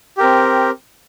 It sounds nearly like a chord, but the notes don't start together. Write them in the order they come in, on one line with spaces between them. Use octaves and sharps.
G4 A#4 C4